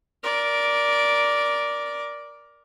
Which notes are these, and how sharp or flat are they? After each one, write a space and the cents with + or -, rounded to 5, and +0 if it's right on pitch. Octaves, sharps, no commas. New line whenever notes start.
A#4 +15 D5 -5